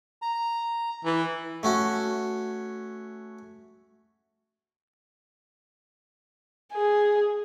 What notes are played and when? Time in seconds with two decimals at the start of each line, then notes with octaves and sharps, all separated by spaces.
0.22 A#5
1.05 E3
1.63 A3 C#4 F#4
6.73 G#4